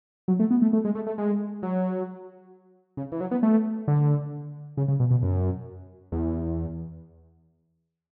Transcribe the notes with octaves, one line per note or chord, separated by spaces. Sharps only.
F#3
A3
B3
A3
A3
G#3
A3
A3
G#3
F#3
C#3
E3
F#3
B3
A3
D3
C#3
C#3
B2
B2
F#2
E2